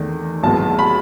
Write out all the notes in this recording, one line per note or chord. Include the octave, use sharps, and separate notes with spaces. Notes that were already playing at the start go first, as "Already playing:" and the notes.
Already playing: E2 D#3 A3
B1 A2 G#3 B3 A5
B5